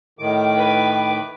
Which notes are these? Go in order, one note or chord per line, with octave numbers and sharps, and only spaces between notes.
A2 D#3 D6
B4